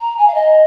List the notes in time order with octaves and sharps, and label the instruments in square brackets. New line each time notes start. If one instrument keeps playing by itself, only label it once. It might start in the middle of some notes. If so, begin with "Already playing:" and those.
[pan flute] A#5
G#5
F5
D#5